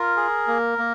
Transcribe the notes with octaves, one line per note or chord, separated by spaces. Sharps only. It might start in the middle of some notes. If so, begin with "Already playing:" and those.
Already playing: F4 A#4
G#4
A#3
A#3